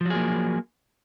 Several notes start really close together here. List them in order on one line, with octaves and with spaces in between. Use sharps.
F3 F#3 G#4 A#3